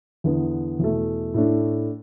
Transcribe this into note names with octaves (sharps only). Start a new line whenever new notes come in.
E2 D3 B3 E4
E2 B2 A3
A2 A3 D4